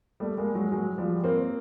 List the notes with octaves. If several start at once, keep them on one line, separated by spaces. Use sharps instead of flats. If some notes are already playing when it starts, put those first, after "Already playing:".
G3 A3
G#3 A#3
F#3 G#3
F#3 G#3
F3 G3
A#3 C4